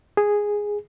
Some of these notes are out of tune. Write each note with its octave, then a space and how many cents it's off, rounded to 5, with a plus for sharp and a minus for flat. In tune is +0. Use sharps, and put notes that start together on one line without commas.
G#4 -5